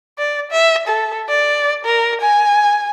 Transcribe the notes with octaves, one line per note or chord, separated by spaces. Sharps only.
D5
E5
A4
D5
A#4
G#5